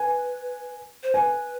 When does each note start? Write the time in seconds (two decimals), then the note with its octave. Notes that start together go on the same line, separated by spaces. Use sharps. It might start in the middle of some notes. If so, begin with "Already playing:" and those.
Already playing: B4 G#5
1.03 C5
1.14 B4 G#5